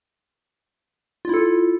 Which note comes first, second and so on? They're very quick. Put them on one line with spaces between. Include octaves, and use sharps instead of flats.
F4 E4 A4